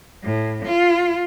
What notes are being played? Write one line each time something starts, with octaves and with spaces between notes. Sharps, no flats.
A2
F4